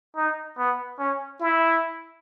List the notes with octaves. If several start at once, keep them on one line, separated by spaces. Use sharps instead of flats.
D#4
B3
C#4
E4